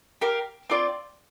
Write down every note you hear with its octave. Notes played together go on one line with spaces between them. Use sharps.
G4 A#4 F5
C4 F4 D5